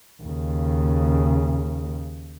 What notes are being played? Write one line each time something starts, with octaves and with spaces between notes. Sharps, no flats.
D#2 C#3